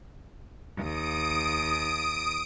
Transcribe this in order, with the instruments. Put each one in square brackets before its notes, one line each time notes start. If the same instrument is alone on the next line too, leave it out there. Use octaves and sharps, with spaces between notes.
[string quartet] D#2 [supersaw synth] D#6 D7